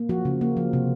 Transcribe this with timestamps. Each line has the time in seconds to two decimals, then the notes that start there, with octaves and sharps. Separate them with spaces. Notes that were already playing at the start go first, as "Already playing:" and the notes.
Already playing: A#3
0.09 F3 F#4
0.25 C#3
0.41 A#3
0.57 F3
0.73 C3